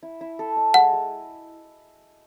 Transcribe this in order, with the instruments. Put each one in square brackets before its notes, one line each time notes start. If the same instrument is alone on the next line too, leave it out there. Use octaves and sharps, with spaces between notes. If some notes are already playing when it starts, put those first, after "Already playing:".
[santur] E4
E4
A4
D#5
[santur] G#3 [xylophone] F#5
[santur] G#3